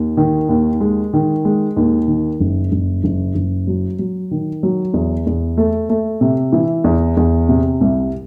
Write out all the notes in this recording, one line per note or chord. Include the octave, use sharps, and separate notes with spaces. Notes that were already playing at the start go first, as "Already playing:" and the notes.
Already playing: D#2
D#3
D#2
G#3
D#3
G#3
D#2
D#3
F#1
F#1
F#1
F#1
F#3
F#3
D#3
F#3
E2
E2
A3
A3
C3
E3
E2
E2
C3
C2